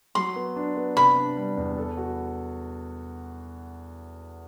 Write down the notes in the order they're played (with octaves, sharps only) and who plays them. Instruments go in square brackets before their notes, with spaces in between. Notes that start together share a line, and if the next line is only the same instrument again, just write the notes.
[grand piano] F#3 [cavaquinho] C6
[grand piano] B3
D4
B3
[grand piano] C3 [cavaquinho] B5
[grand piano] D4
G3
E2
A4
F#4